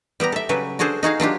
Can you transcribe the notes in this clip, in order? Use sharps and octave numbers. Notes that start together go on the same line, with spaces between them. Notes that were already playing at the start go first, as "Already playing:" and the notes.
G3 B3 G4 A#5
A4 E5
C#3 F#3 G3 B4
D4 F#4 G#4 A4 C5
D#4 F#4 G#4 F5
F#3 D4 F4 G4